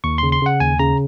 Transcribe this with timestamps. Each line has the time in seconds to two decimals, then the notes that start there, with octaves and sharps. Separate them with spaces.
0.04 D#2 C#6
0.18 C#3 C6
0.32 C6
0.42 C#3 F#5
0.60 D#2 G#5
0.79 C#3 A#5